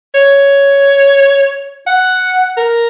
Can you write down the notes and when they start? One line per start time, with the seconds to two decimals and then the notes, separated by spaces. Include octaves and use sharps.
0.14 C#5
1.87 F#5
2.57 A#4